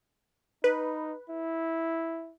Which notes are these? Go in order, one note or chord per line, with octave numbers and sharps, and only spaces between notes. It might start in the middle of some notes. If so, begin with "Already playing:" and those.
D#4 B4
E4